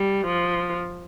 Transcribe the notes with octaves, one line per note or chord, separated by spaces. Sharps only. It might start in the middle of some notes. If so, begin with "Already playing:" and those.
Already playing: G3
F3